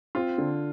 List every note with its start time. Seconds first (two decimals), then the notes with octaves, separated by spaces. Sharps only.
0.15 C4 F4
0.38 D3